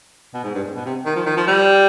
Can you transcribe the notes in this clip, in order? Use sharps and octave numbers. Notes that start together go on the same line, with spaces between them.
B2
G#2
G2
G#2
B2
C3
D#3
F3
D#3
F3
G3